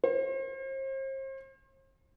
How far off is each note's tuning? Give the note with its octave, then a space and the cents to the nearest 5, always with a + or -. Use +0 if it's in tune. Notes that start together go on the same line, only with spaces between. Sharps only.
C5 +40